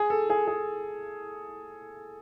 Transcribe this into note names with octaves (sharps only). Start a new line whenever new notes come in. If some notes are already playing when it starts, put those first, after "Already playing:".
Already playing: G#4
A4
G#4
G#4